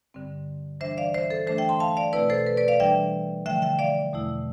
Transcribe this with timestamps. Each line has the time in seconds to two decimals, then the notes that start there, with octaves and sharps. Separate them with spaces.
0.14 G2 D3 G3 C4
0.80 E3 G3 D4 C5 E5
0.97 D5 F5
1.14 C5 E5
1.30 A4 C5
1.46 E3 A3 D4 C5 E5
1.58 E5 G5
1.69 A5 C6
1.80 F5 A5
1.97 D5 F5
2.13 B2 A3 C4 E4 B4 D5
2.30 A4 C5
2.47 B4
2.57 B4 D5
2.68 D5 F5
2.80 E3 G3 D4 E5 G5
3.46 D3 F3 A3 E5 G5
3.62 E5 G5
3.79 D5 F5
4.13 E2 B2 A3 E4